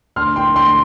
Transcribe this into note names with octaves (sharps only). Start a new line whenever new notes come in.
D2 C6 F6
G5 C6
D2 G5 C6
C6